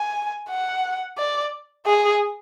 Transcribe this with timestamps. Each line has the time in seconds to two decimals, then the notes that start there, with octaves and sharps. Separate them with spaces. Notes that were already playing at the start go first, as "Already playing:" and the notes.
Already playing: G#5
0.49 F#5
1.18 D5
1.86 G#4